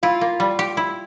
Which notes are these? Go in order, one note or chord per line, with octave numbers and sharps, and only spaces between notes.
E4 F4
A#3
G3
G4
E4